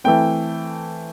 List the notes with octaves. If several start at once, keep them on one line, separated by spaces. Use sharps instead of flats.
E3 A3 C4 G5